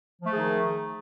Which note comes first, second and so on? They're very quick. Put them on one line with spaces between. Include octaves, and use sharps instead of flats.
F3 A3 D#3 G#4 D#4